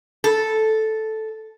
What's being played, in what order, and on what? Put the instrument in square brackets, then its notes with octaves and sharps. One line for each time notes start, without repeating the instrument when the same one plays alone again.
[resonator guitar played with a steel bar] A4